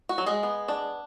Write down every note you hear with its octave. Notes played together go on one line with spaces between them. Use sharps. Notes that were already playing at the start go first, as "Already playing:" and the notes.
F#4
F#3
G#3 G#4
B3
D4